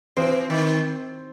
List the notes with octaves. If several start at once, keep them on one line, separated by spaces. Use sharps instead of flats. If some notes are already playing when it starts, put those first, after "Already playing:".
E3 C4 C5
D#3